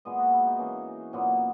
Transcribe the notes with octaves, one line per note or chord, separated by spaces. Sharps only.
A#2 G#3 B3 D#5
F#4
E4
D#4
E3 A#3 C#4
A#2 F#3 B3